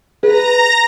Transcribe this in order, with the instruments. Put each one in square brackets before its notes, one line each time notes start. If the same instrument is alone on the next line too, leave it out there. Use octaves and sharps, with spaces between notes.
[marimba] G#4 [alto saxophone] B4 [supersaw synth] A#5 A#6